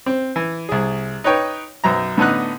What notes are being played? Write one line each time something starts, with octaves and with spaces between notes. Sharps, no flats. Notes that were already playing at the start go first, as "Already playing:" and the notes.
C4
E3
C2 G#4
D#4 B4 C#5 G5
B1 F#2 A#5
A2 D3 B3 D#4 F#6